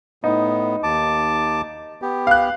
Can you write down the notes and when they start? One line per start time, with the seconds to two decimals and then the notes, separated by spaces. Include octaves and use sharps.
0.24 A2 B3 D#4
0.83 D#2 A5 D6
2.02 B3 G4
2.27 F5 F#6